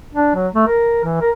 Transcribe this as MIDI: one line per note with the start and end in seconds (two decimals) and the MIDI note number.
0.13 0.33 62
0.35 0.48 54
0.55 0.64 57
0.67 1.00 70
1.04 1.17 52
1.21 1.30 70